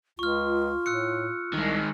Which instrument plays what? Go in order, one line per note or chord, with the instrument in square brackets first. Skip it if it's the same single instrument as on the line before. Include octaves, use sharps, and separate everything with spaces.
[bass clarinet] C#2 [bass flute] F4 [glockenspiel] C#6 F6
[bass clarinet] A2 [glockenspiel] E6 F#6 C#7
[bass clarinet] C2 [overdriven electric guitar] D#3 G#3